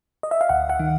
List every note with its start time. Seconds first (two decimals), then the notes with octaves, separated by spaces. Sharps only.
0.23 D#5
0.31 E5
0.41 F5
0.49 D2 F#5
0.70 F#5
0.79 D#3